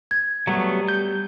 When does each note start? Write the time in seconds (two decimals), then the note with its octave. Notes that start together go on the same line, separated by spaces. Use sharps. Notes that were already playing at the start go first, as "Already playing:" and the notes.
0.11 G#6
0.47 F#3 G3 A3 B3
0.88 G6